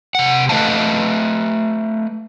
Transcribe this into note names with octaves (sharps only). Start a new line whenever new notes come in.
C3 F#5
A3 B4 D#5 F5 A5